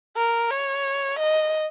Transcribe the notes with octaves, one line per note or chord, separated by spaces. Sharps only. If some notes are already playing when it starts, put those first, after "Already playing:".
A#4
C#5
D#5